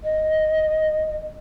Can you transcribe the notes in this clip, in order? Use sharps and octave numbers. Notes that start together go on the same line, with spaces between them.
D#5